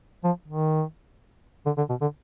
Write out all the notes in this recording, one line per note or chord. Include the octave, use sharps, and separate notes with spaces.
F3
D#3
D3
D3
B2
D3